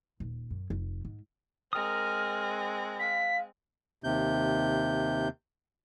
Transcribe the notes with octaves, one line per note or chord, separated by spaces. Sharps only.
D#1
F#2
F1
G#2
G#3 C4 A#4 D#6 F6
F5 B6
D#2 C3 G6